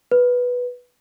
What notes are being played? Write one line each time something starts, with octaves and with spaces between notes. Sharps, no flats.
B4